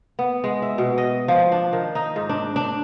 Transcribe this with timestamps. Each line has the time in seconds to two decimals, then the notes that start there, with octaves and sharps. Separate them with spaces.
0.19 B3
0.44 G#3
0.62 E5
0.78 B2
0.98 D#5
1.28 F3
1.52 D4
1.73 D#3
1.95 D#4
2.16 G#2
2.29 D4
2.56 D4